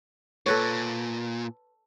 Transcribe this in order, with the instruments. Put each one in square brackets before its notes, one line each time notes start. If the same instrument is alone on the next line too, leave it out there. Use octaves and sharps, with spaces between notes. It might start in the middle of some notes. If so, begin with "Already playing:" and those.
[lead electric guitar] A#2 [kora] A4 B4 C#5